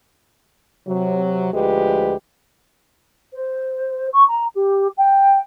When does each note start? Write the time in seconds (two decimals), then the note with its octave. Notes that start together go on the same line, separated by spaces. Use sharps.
0.87 C3 F#3
1.53 D2 F3 G#3 G4 B4
3.33 C5
4.13 C#6
4.28 A#5
4.55 G4
4.97 G5